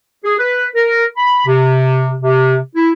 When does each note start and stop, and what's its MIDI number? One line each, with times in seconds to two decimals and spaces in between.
0.24 0.35 68
0.39 0.66 71
0.75 1.04 70
1.17 1.45 83
1.47 2.14 48
2.22 2.57 48
2.76 2.91 64